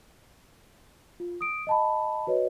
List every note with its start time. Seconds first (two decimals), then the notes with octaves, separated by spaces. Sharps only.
1.20 F4
1.41 D#6 D7
1.67 D#5 A5 B5
2.27 F#4 B4 C#5 D#5